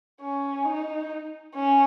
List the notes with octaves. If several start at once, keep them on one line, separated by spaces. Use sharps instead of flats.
C#4
D#4
C#4